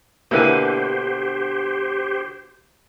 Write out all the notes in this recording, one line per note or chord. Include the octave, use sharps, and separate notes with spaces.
B2 D3 A#3 E4 G4 B4 C5 G#5